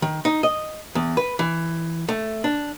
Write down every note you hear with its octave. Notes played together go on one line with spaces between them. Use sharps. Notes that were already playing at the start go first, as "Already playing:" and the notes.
D#3
D#4
D#5
E2
B4
E3
A3
D4